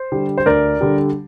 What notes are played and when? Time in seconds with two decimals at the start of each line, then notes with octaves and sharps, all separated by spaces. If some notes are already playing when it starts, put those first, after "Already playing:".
Already playing: C5
0.12 D3 G3
0.38 C5
0.46 D2 A#4 D5
0.81 D3 G3